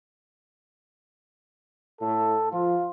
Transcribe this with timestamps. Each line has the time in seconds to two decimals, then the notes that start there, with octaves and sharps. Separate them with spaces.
2.01 A2 A4
2.52 F3 F4